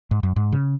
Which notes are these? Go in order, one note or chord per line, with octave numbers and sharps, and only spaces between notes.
G#2
F#2
G#2
C#3